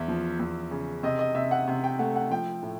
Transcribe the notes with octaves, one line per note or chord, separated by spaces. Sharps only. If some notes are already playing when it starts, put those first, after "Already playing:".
Already playing: E2 E5
F3
E2
C#3
C3 D#5
D#5
C3 E5
F#5
C3
G5
A3 F#5
F#5
F3 G5
A2